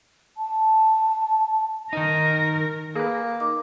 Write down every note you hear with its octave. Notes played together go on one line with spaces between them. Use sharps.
A5
D#3 D#4 A#4
A#3 G#4 B4
D#4 D6